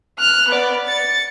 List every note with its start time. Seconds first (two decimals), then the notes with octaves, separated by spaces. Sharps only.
0.21 F6 F#6
0.50 B3 D5
0.87 A6 C#7